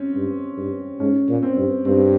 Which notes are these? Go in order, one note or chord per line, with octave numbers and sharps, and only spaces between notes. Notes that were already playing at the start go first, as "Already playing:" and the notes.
Already playing: C4 C#4
G2
G2
G#2 C#4
A#2
C4
G2
G2 C4